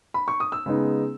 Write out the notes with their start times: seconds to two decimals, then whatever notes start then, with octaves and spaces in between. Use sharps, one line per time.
0.14 B5
0.28 C#6
0.40 D#6
0.52 E6
0.66 C#3 G#3 B3 D#4